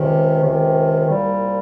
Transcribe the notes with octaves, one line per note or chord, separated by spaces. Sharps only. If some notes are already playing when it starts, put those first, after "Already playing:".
Already playing: C#2 C3 D#3
C#2 C3 D#3
C2 A#2 G3